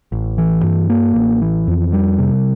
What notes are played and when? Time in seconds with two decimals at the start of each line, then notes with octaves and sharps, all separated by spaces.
0.12 A1
0.38 E3
0.63 G2
0.90 A#3
1.15 A1
1.41 E3
1.68 F2
1.93 G3
2.19 C3